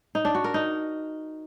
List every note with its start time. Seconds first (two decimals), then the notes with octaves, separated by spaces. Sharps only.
0.15 D#4
0.25 D4
0.35 F#4
0.44 A#4
0.54 D#4